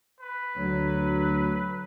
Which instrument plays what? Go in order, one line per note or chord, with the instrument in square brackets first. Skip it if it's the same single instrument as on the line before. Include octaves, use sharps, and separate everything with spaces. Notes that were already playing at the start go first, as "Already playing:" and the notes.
[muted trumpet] B4
[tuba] D2 [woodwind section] F#3